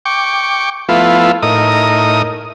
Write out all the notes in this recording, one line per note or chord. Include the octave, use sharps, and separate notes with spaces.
G5 C#6 D6
F3 A3 B3 E4 F4
A2 D#4 A#4 D#6